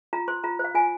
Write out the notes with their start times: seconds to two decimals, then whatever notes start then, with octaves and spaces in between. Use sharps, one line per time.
0.13 F4 A#5
0.28 C5 C6
0.44 F4 A#5
0.59 C5
0.64 F5
0.75 F4 G#5